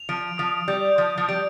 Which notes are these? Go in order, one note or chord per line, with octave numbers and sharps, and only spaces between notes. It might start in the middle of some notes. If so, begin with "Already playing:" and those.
Already playing: F7
F3 D7
F3 D#6
G3 G6
F3 G6
F3
G3 D7